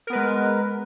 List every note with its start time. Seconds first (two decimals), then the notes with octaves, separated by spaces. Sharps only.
0.07 A#4
0.10 B3
0.13 B4
0.15 G#3